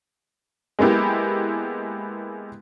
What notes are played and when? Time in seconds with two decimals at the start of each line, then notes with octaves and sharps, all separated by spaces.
0.79 G#3 A#3 B3 E4 G4